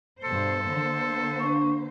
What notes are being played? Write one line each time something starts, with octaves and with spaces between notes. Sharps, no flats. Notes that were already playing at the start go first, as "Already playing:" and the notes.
G2 B2 A4 C5
D3 A#3 C5
D4 C#6